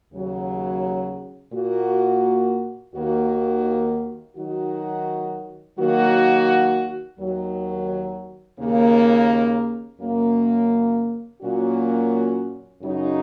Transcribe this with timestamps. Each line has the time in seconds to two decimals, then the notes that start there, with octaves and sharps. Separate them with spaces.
0.12 D#2 C#3 F#3
1.53 A#2 A#3 F#4
2.95 D#2 D#3 A#3 F#4
4.36 D#3 F#3 D#4 F#4
5.76 D#3 F#3 A#3 F#4
7.18 D#2 D#3 F#3
8.58 D#2 C#3 A#3
10.00 F#2 C#3 A#3
11.41 A#2 F#3 A#3 C#4 F#4
12.82 F#2 C#3 F#3 D#4